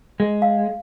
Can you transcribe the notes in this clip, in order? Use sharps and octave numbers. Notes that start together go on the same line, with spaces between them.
G#3
F5